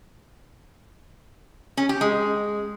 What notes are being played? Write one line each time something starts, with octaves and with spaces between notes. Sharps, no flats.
C#4
G4
G#3